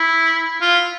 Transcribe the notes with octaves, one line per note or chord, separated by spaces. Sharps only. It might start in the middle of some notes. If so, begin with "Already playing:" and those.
Already playing: E4
F4